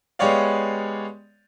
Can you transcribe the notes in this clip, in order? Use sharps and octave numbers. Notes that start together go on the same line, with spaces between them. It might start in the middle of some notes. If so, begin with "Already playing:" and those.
G#3 B3 G4 C#5 D5 F5